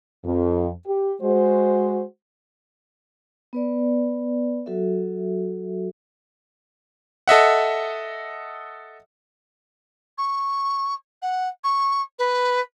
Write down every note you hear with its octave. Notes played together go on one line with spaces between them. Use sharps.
F2
G4
G#3 F#4 C5
B3 B4 D5
F#3 F#4 A4 E5
A4 D#5 E5 F#5
C#6
F#5
C#6
B4